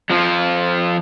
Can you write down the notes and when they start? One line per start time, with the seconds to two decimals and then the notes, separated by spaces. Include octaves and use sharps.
0.10 F2 F3